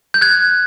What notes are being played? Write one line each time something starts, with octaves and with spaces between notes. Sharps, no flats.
G6
F#6 G#6